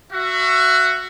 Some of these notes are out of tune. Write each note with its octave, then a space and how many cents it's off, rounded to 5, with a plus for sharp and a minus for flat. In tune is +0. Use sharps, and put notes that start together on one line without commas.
F#4 +0 E5 +30